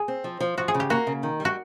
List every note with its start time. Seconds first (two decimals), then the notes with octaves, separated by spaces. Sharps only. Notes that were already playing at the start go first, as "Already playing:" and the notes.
Already playing: G#4
0.08 C4
0.24 F3
0.40 F3
0.57 F3 F#4
0.68 G#4
0.74 C#3
0.80 G4
0.90 A#3 F#4
1.07 C#3
1.23 D#3
1.40 G3
1.45 F#4